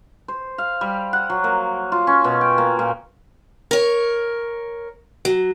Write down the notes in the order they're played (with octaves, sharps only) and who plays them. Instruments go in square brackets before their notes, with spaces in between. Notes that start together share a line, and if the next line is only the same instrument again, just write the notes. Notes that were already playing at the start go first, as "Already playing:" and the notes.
[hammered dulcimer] C5
F5
G3
F#5
F#3
A#3
F4
C#4
B2
G5
A#3
A#2
[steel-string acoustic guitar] A#4 C#5
F#3